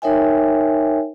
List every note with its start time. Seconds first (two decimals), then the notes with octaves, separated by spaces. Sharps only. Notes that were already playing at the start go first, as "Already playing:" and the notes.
0.02 D#4 A#4 C#5 E5 G5 G#5